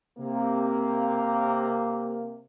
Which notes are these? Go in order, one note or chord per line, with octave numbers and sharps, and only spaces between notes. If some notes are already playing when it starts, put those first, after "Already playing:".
C3 A#3